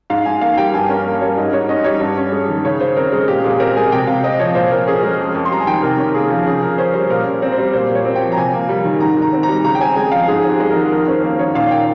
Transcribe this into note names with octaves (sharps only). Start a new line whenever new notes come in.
G#2 F5
G#2 G#5
A#3 F5
G3 G5
G2 G#5
C#4 A#4
A#3 A#4
G3 C#5
G#2 D#5
G#2 C#5
C#4 D#5
G3 C#5
G2
C#4
G#3
D#3
C#3 C#5
C#3 C5
C4 A#4
G#3 A#4
A#2 G4
A#2 G#4
C4 A#4
G#3 G#5
C3 G5
C3 F5
C4 D#5
F3 C#5
A#2 C5
A#2 A#4
C#4 G#4
G#3 A#4
F2
F2
C6
G3 A#5
G#5
D#3 G5
C3 A#4
C#4
A#3 G#4
F3
C#3 G#4
C#3 A#4
C#4 C5
G3 C5
A#2 A#4
A#2
C4
C5
G3
A#2 C5
A#2
C#5
C4
G5
F3
A#5
C3 G#5
A#3
G3
D#3
G#2 A#5
G#2
A#5
C4
A#5
G3
C#3 A#5
G5
C4 G#5
G#3 G#5
F3 F5
G#2 G#4
C4
G4
G#3
A#4
D#3
F2 A#4
C#4 C5
A#3 C5
D#3 C#5
A#2 F5
A#2 G5